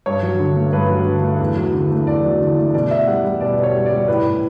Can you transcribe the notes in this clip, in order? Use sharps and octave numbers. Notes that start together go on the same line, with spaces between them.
G2 C#5
F#3
D3
A3
G2 B4
F#3
D3
A3
E2
F#3
D3
A3
E2 D5
F#3
D3
A3
B2 D5
B2 E5
G3 F#5
G3
B2 D5
B2
C#5
G3
D5
G3
A2 B4
A2